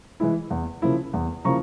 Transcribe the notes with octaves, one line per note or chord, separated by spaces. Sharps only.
E3 G#3 E4
E2
C#3 F3 A#3 E4
E2
C#3 F3 A#3 E4 A#5 C#6